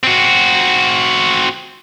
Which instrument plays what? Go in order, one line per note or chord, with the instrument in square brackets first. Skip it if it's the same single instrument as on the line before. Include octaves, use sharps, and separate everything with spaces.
[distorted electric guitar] C4 F#4